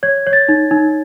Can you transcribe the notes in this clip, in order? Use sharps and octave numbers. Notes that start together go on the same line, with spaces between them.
C#5 G#6
C#5
A6
D#4
D#4